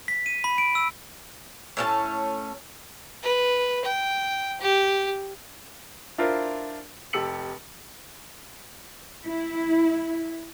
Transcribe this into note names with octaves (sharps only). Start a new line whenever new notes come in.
B6
D#7
B5
D7
E6
A2 C#4 A5
B4
G5
G4
D4 E4 F4 A#4 C5
F1 G4 A4 E6 C#7 F#7
E4